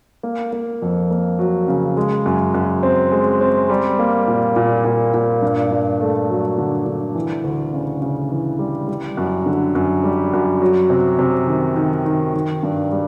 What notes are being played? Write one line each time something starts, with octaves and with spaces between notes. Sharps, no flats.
A#3
A#3
F2
A#3
F#3
C#3
G#3
F#2
F#2
C4
G#3
C4
G3
A#3
A#2
A#2
A#2
A#2
G2
G2
A3
F#3
D3
D3
E3
D2
C#3
C#3
E3
G3
G3
F#2
D3
F#2
G3
F#2
F#3
C3
C3
D#3
D#3
D#3
D#3
G2
G3